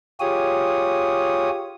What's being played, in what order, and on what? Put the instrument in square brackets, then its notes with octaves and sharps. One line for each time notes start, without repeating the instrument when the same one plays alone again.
[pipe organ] F4 G4 G#4 C#5 D#6